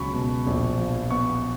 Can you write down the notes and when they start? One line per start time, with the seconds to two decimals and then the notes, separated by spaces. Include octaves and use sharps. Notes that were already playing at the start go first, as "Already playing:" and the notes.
Already playing: C#2 B2 F#3 B5 C#6
0.14 B2
0.46 A#1
0.78 F3
1.11 B3 C#6